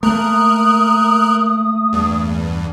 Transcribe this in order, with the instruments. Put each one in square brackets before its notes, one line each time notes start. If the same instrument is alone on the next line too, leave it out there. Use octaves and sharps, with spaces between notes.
[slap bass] A3 A#3 [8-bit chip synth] A#4 F#6 [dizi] D#6
[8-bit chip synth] E2 G2